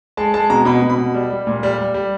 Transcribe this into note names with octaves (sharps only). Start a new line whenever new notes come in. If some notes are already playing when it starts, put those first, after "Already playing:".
G#3 A5
G#3 A5
B2 A#5
B2 B5
B2
B5
B2
G3
G3
A#2
G3
G3
G3